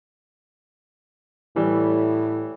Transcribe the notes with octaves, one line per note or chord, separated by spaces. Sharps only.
A2 E3 G3